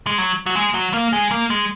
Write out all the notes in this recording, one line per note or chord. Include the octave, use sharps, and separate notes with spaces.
G#3
F#3
F#3
G#3
F#3
A#3
G#3
A#3
G#3